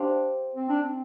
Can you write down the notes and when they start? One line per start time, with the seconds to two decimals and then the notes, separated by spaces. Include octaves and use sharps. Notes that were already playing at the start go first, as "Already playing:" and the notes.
Already playing: D4 G4 C5 F5
0.56 C4
0.69 D4
0.83 C4